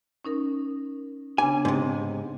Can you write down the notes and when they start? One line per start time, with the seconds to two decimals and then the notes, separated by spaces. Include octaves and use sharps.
0.25 C#4 D#4 A#4
1.38 C#3 B3 D4 G#5
1.65 G#2 C3